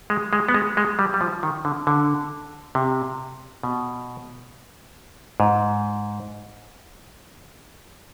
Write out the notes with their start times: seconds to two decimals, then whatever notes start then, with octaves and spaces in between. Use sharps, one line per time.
0.10 G#3
0.33 G#3
0.48 B3
0.54 G#3
0.77 G#3
0.99 G3
1.14 G3
1.21 F3
1.43 D#3
1.65 D3
1.87 D3
2.75 C3
3.63 B2
5.40 G#2